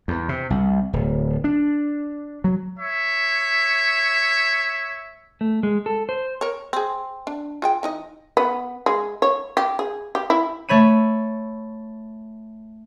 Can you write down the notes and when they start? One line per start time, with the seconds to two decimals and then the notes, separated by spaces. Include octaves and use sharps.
0.08 E2
0.29 C3
0.50 C2
0.93 D1
1.44 D4
2.44 F#3
2.79 C#5 E5
5.41 A3
5.63 G#3
5.86 A4
6.09 C5
6.41 A#4 C#5
6.73 C4 G#4
7.27 D4
7.62 F4 G#4 G5
7.83 E3 D#4 D#5
8.37 B3
8.86 G#3
9.22 C#5
9.57 G4
9.79 G#4
10.15 G4
10.30 E4
10.69 A3 C#5 B5 D#7